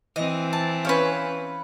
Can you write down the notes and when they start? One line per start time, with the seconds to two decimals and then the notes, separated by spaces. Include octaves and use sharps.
0.16 E3 C4 D#5
0.53 A5
0.85 C#4 B4 C#5 F5 G5